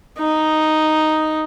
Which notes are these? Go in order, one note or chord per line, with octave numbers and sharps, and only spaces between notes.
D#4